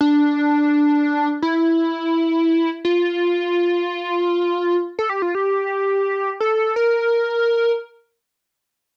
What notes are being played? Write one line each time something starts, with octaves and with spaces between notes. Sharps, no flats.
D4
E4
F4
A4
G4
F4
G4
A4
A#4